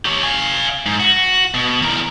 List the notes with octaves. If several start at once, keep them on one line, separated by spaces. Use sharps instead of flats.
G4 C#5
F5 G#5
G#2
F#4
B2
E2 A#4